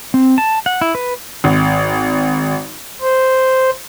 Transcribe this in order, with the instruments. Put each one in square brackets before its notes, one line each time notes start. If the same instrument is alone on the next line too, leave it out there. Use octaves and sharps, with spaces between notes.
[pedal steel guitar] C4
A5
F#5
E4
B4
[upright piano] G#1
[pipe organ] C5